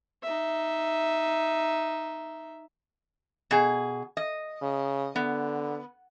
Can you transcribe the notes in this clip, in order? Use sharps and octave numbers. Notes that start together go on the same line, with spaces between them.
D#4 E5
B2 G#4
D#5
C#3
D3 B3